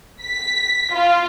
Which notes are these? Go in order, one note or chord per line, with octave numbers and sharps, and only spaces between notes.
B6
F4